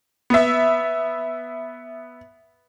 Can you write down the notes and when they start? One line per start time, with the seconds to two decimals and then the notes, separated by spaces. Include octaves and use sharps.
0.30 B3 E5